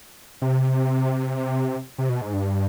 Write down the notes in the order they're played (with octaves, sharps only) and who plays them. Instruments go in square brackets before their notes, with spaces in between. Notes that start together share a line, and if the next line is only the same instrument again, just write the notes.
[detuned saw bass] C3
C3
B2
G#2
G2